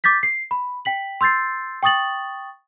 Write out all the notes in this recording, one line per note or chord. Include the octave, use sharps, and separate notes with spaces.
D6 G6 A6 B6
C7
B5
G5 B6 F#7
C6 E6 G6 A6 C7
G5 C#6 D#6 A6 F#7